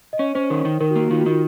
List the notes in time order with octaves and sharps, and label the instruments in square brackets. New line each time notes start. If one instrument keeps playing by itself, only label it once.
[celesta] D#5
[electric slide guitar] C#4 [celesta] C#5
[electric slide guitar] C#4 [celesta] C5
[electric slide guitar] D#3 [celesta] A#4
[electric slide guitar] D#3
[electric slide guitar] D#3 [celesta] A#4
[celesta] F#4
[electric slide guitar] A#3
[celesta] F#4
[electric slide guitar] D#3 [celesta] F4
[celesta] F#4
[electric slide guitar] D#3 [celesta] F4